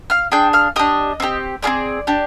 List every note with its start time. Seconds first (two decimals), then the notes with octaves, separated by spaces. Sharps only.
0.10 F5 F6
0.32 D4 G#4 G5 G6
0.53 F5 F6
0.76 D4 G4 D#5 D#6
1.20 C4 D#4 G4
1.62 C4 F4 G#4 D5 D6
2.07 D4 G4